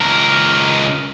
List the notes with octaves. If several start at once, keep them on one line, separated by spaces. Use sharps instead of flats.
C#2 A#4